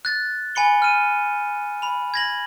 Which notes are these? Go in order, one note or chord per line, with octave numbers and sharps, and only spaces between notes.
F#6 A6
G#5 B5 C#7 G7
F6 D#7
B5 F7
G#6 A#6 F#7